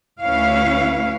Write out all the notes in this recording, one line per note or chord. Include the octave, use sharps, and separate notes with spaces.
D2 C#4 E4 B4 C#5 F5